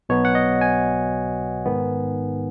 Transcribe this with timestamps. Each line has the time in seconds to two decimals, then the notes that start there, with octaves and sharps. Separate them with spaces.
0.09 B1 B2 F#3 B3 C#5
0.25 F#5
0.35 D#5
0.61 G#5
1.66 G#2 D#3 B3